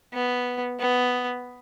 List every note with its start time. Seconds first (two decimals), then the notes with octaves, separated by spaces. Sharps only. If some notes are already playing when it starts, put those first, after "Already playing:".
0.13 B3
0.80 B3